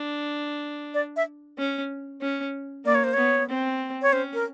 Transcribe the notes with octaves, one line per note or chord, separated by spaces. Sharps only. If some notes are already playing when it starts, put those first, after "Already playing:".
Already playing: D4
D5
E5
C#4
C#4
A#3 D5
C#5
C5
B3 C#5
C4
C#5
C#4 C5
A#4